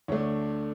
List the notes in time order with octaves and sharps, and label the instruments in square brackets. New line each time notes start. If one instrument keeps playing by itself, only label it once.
[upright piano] D2 D3 A3 D4 C#5